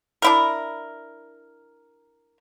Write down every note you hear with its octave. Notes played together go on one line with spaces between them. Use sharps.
D4 E4 A#4